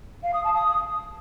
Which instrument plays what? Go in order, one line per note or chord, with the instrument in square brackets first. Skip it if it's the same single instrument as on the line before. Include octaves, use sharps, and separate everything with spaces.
[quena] F5
D#6
A5
D#6